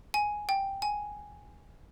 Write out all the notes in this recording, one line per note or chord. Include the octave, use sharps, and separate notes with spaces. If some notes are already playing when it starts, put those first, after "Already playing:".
G#5
G5
G#5